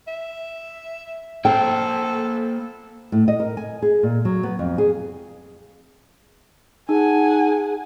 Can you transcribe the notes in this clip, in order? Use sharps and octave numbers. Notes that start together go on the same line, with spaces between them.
E5
A#3 A4 C5 G5
A2
D#5
A#4
G#5
G#4
A#2
F#3
B3
F2
G#4
D#4 G#4 F#5 G#5